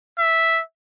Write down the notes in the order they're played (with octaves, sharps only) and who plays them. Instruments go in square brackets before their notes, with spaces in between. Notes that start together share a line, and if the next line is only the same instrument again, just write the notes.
[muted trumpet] E5